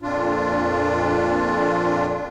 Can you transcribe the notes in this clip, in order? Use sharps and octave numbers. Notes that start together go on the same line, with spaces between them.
F2 A#2 D4 F4